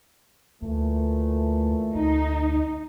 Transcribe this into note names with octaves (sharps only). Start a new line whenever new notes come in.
D2 A#2 E3 A3
D2 D#4